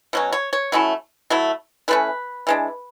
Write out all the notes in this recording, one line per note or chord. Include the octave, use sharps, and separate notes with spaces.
B2 F#3 C#4
C#5
C#5
F#3 A3 C#4 E4
F#3 A3 E4
E3 A3 C#4 B4
E3 G#3 D4